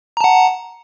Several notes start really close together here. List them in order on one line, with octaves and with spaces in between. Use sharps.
A#5 A5 F#5